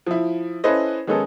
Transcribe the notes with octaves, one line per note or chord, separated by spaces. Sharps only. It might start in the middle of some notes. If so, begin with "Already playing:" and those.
F3 E4
C#4 E4 A4 B4 C5 D#5
D#3 G#3 B3 C#4 D#4 A4